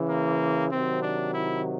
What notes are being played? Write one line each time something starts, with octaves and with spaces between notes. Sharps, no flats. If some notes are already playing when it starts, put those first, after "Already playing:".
Already playing: C#3 E3
A#3
C3 D#3 F#3 C4
D4
E4